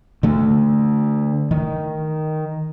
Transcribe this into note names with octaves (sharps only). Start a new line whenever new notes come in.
D3 A3
D#3